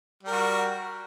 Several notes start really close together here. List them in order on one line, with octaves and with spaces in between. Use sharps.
G3 A#4 F#4